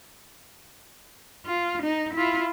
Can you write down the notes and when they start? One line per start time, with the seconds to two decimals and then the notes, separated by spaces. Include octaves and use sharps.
1.46 F4
1.82 D#4
2.14 E4 F4